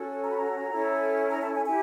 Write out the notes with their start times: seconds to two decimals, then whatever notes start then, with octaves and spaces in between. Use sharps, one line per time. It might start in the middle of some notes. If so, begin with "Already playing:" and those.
Already playing: C#4 F#4 A4
0.22 A#5
0.30 B5
0.37 A#5
0.70 C#4 E4 A4
1.30 A#5
1.42 A5
1.54 G#5
1.65 E4 G4 G#5